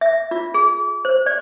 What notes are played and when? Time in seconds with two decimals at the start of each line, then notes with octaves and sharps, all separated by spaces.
0.01 E5
0.31 F4
0.54 G#4
1.05 C5
1.26 D5